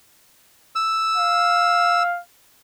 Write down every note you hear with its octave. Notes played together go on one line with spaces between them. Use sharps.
E6
F5